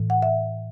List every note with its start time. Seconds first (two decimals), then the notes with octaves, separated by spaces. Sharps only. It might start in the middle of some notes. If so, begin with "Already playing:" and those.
Already playing: A2 E3
0.10 F#5
0.22 E5